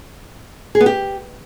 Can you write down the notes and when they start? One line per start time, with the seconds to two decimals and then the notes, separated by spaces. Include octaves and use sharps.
0.75 G#4
0.80 B3
0.86 G4